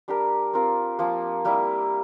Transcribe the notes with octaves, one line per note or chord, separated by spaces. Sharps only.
G3 D4 G4 A#4
C4 F4 A#4
F3 A#3 F4
G3 A#3 E4